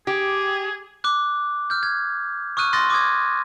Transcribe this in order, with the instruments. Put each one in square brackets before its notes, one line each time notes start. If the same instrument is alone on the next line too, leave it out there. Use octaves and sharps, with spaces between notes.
[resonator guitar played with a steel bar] G4 [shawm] G#4
[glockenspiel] D6 F#6
F6 G6
G#6
C#6 D#6 F6 F#6 D#7
C6 D#6 F#6 A6 A#6
D6 D#6 G#6